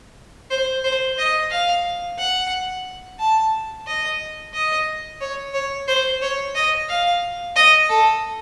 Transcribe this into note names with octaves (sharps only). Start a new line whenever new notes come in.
C5
C5
D#5
F5
F#5
A5
D#5
D#5
C#5
C#5
C5
C#5
D#5
F5
D#5
A4